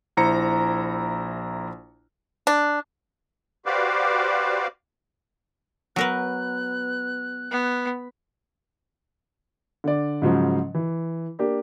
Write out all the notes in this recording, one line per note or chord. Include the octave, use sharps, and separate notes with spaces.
A#1 E4 C5 A#5 C#7
D4
F#4 G4 B4 C5 D5 F5
F#3 B3 A#4 B4 F#6
B3
D3 D5
G#2 C#3 F3 F#3
E3
A#3 D4 G4